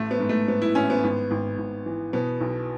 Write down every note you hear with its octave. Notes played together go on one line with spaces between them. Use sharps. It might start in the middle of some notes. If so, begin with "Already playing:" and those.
Already playing: A1 A3
B3
G#2
A3
G#2 B3
E4
A1 C#4
B3
G#1
G#1
G#1
E3
B2 B3
B1